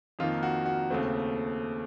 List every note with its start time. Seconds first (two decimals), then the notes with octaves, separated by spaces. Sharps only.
0.19 F2 D#3 A#3 F4
0.43 F#4
0.66 F#4
0.90 D#2 C#3 A3 C4